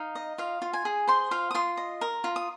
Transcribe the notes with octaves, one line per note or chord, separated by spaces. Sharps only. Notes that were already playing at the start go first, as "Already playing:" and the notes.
Already playing: D#4 F5
D#5
F4 F5
F4
G#5
G#4
C5 C6
F4 F5
D#6
F4 C6
D#5
A#4
F4
D#6